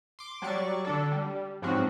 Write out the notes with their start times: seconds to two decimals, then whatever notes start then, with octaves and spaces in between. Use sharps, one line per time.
0.19 C6 D6
0.42 F#3 G3 D5 C#6 A6
0.85 D3 D4 A4
1.12 G3
1.62 G#2 F3 F#3 B3 C4 F#4